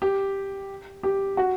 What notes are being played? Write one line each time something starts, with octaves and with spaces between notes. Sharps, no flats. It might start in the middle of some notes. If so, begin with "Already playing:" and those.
G4
G4
F#4